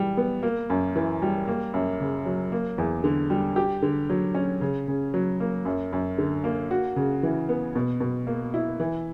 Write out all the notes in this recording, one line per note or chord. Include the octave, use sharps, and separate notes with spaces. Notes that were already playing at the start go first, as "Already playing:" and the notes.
Already playing: E3 G3
B3
A#3
F#2
E3
G3
A#3
F#2
C#3
F#3
A#3
E2
D3
G3
G4
D3
F#3
C#4
C#3
C#3
F#3
A#3
F#2
F#2
D3
A#3
F#4
C#3
E3
B3
B2
B2
A#3
E4
E3